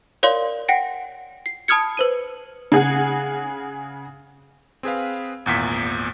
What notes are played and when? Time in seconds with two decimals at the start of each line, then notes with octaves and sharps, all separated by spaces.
0.23 A#4 C#5 D5 F5 C6
0.68 F#5 G5 A#6 D7
1.46 C7
1.68 A5 B5 D#6 F6 G#6 C#7
1.97 B4 C5 D#7
2.72 C#3 G#4 F#5
4.83 C4 G#4 B4 F5
5.46 G#1 E2 A#2 B6